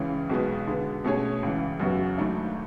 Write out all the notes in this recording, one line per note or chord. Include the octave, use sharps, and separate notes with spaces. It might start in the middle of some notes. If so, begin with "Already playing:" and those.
Already playing: C#2 C#3 E3 G#3 C#4
B1 B2 G#3 B3
D3 G#3 B3
B2 A3 C#4 G#4 C#5
C#2 C#3 E3
F#2 C#3 F#3 B3 F#4
G#1 G#2 F#3 A3 D4